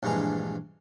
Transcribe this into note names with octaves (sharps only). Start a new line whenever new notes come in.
A#1 G2 E3 G#3 A#5